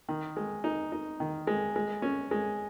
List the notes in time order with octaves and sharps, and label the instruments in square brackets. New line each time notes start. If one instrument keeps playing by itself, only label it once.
[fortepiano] D#3
G#3
D#4
D#4
D#3
G#3
G#3
C#4
G#3